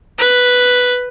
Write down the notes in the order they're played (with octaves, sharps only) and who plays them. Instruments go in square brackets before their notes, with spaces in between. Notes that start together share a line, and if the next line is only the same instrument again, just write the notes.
[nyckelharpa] B4